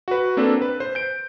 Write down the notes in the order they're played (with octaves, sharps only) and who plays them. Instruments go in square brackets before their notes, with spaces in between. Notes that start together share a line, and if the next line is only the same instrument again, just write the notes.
[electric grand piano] F#4 B4
A#3 C4 D4 A4 B4
B4
C5
G6 D7